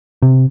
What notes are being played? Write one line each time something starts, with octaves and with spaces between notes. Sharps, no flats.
C3